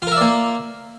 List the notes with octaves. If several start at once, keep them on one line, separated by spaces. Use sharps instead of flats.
A#3 F4 A#4 D5 E5